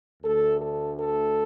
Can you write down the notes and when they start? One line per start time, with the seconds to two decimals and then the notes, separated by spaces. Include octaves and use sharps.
0.23 D2 D3 A3 D4 A4
0.61 A4
0.98 A4